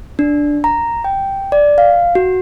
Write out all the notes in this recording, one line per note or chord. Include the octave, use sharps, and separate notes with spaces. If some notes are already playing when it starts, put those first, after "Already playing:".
D4
A#5
G5
D5
F5
F#4